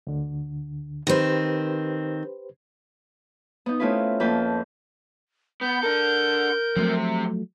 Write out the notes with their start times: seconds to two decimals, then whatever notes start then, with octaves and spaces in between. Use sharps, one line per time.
0.07 D2 D3
1.07 D#3 C4 G4 B4 C5
3.66 B3 D#4
3.80 A3 C4 C#4 E4 F4 B4
4.20 F2 A#3 B4 G5 A5
5.61 B3 G6
5.83 D4 A4 A#4
6.76 C3 F3 F#3 A3 C4